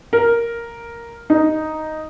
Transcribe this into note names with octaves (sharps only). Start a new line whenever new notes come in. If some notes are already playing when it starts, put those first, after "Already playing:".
A#4
D#4